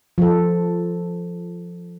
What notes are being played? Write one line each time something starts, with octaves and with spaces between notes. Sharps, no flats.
F3 A4